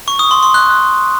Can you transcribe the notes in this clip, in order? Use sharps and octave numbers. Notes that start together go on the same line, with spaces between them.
C#6
D#6
C6
C6
F#6